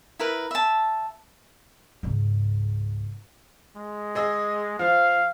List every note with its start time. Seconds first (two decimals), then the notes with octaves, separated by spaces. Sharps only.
0.19 E4 A#4 B4
0.51 E5 A5
2.03 C#2 G#2
3.76 G#3
4.15 G#4 D#5 E6
4.79 F3 F5